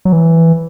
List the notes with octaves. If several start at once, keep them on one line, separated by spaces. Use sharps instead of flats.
F#3
E3